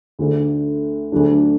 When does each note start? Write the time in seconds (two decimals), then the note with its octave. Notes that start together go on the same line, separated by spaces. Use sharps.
0.19 D2 D3 A3
1.12 D2 D3 F#3 A3 D4